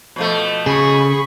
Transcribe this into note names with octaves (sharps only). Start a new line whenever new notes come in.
B2 F3 A3
C#3 G#4 B5 C#6